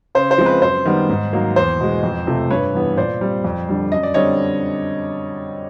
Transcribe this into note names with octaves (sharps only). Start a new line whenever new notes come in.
C#3 C5
C5
F3 G#3 C4
B4
F#2 C5
D#3 G3 B3
G#2
D#3 F#3 A#3
E2 C5
B2 G#3
F2
C3 F3 A3
G2 B4 C#5
E3 G3 B3
A#2 C5 D5
G3 C4
F2
D3 G3
F#2 D#5
D5
D3 G3 C4 C#5 D#5